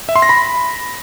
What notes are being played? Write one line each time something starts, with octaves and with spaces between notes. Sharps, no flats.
E5
C6
A#6
B5